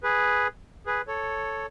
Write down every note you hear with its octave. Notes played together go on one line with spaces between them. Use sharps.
G#4 B4
G#4 B4
A4 C#5